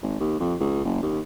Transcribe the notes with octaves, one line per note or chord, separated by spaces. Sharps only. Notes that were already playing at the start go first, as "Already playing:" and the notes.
G#1
D#2
F2
C#2
F#1
D#2